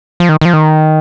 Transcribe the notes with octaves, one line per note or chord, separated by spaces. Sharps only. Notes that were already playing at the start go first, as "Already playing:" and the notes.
F3
D#3
D#3
F3
D#3